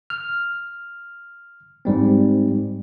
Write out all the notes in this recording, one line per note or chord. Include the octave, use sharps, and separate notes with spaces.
F6
G#2 G3 C4